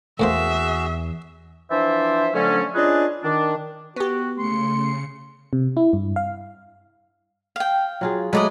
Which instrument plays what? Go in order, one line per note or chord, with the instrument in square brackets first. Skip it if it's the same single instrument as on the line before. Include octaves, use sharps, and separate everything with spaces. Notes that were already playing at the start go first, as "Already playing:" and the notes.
[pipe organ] E2 [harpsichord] A2 A#3 C5 [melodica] F#4 G#4 [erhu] E5
[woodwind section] E3 F3 D4 C5 D5 E5
D3 F3 F#3 A3 C#4
C#4 D4 F4 G#4 B4 D#5
D#3 D4
[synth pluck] B3 G4 [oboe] F#4
[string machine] C#3 C#7 [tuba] A3 [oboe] C6
[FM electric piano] C3
E4
G2
F5
[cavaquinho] F5 G5
[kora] F#3 F4 G#4
[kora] F#3 G#3 A3 [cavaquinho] B4 D5 D#5